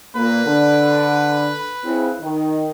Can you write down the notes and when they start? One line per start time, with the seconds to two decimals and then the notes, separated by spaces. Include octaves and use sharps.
0.15 A#2 A#3 B4
0.46 D3
1.84 C#3 C4 E4
2.21 D#3